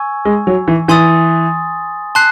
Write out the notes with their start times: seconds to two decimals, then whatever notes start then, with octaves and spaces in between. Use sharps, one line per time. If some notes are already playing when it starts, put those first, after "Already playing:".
Already playing: G#5 C#6 E6 G#6
0.25 G#3
0.47 F#3
0.68 E3
0.88 E3 G#5 C6 D#6 A6
2.15 A5 C6 F#6 C7